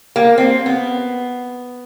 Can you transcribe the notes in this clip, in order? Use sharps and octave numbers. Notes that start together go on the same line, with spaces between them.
A#3
C4
B3